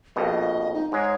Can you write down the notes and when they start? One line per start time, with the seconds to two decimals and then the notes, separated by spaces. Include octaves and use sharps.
0.16 A#1 F2 B2 D#5
0.73 D#4
0.92 G#2 G#3 C#5